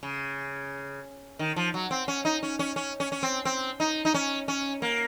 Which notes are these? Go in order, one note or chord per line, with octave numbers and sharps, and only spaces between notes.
C#3
D#3
F3
F#3
C4
C#4
D#4
C#4
C#4
C#4
C#4
C#4
C4
C4
D#4
D#4
C#4
C#4
A#3